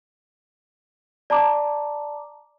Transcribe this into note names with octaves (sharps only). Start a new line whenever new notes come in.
D5 A5 A#5 D6